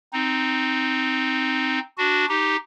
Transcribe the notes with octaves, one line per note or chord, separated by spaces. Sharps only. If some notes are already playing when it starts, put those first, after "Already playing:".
C4 D#4
D4 F#4
D#4 G4